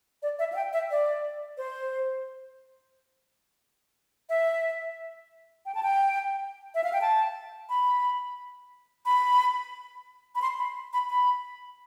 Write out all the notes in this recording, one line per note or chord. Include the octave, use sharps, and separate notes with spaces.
D5
E5
F5
G5
E5
D5
C5
E5
G5
A5
G5
E5
F5
G5
A5
B5
B5
B5
C6
B5
B5
B5